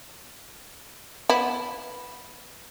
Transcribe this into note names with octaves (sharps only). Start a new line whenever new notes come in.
B3 E4